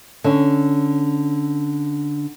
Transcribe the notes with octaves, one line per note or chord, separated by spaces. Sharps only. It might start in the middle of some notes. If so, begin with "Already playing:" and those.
D3 C#4